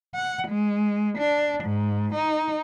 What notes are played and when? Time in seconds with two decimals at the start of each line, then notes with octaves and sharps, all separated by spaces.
0.15 F#5
0.48 G#3
1.18 D4
1.64 G#2
2.15 D#4